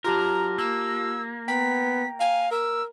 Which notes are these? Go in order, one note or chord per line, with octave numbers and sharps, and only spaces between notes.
F#3 F4 G4 A#4 A5 A#5
A#3 E6
B3 G5 A#5 B6
F5 G#5
A#4 E6